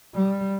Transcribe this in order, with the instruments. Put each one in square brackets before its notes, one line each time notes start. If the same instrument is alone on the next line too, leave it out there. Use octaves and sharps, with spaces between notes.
[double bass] G3